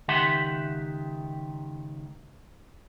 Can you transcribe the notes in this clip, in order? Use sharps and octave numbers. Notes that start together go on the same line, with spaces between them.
C#2 D#3 G4 E5 F#5 C6